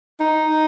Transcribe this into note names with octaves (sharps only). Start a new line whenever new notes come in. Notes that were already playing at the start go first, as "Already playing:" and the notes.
D#4